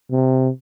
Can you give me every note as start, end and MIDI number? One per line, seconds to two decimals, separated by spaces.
0.11 0.49 48